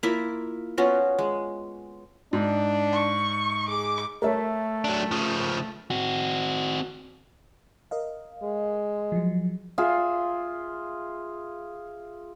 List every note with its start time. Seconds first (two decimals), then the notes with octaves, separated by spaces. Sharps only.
0.03 A#3 E4 F4 A#4
0.78 B3 C#4 F4 F#4
1.19 G#3
2.33 G#2 D4
2.93 C#6
3.68 G#4 D6
4.22 A3 A#4 C#5 E5
4.84 F#3 D4
5.12 C#3 F3
5.90 C4 F#4
7.91 A#4 D#5 F5
8.43 G#3
9.12 F3 F#3
9.78 F4 G#4 E5